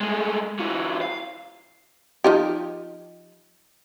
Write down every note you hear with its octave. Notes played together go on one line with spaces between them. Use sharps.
G#3 A3
E3 F#3
F5
F3 D#4 G4